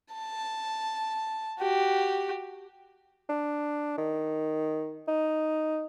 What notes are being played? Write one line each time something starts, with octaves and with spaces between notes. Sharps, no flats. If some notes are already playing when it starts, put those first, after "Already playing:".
A5
F#4 G4
D4
D#3
D#4